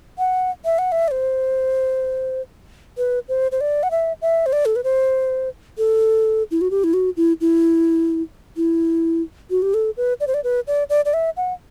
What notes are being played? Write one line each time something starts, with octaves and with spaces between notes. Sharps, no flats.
F#5
E5
F#5
E5
D5
C5
B4
C5
C5
D5
F#5
E5
E5
C5
D5
A4
B4
C5
A4
E4
F#4
G4
E4
F#4
E4
E4
E4
F#4
G4
A4
B4
D5
C5
D5
B4
D5
D5
D5
E5
F#5